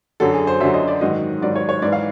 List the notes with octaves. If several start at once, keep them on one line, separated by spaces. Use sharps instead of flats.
F#2 D3 F#3 A4
G#4
C5
F#2 D3 F#3 E5
D#5
D5
G#2 D#3 F#3 D#5
G#2 D#3 F#3 D5
C#5
C#5
G#2 E3 D5
F5